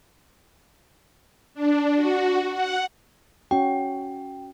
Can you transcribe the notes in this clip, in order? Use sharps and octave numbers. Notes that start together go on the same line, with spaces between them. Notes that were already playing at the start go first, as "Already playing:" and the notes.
D4
F#4
F#5
C#4 F#4 G5